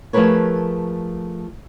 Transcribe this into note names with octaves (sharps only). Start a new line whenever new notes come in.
F3 A3 G#4 A#4 B4 C#5